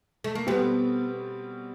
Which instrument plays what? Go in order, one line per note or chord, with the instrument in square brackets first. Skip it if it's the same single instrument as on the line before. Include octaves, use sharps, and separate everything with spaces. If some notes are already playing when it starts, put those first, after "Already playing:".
[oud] A3
A#3
[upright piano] B2 G3 C4 [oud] B3